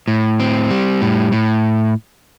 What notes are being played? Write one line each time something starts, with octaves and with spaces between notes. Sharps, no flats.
A2
C4
G3
A2
A2